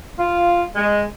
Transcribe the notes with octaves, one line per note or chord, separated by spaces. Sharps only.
F4
G#3